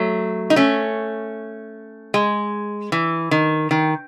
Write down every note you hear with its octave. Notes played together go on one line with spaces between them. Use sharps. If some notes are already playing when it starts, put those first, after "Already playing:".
Already playing: F#3 A3
D#4
A3 C#4
G#3
E3
D#3
D#3